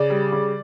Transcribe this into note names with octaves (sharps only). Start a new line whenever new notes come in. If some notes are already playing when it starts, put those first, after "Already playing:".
Already playing: C#3 D5
G3
C#3